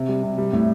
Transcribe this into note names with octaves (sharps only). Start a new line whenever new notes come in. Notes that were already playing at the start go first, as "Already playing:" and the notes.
Already playing: C3
G3
C3
G3
A2